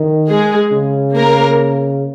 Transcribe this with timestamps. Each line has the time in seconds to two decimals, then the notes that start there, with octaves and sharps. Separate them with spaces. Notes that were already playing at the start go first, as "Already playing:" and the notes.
Already playing: D#3
0.28 G#3 G#4
0.72 C#3
1.15 A#3 A#4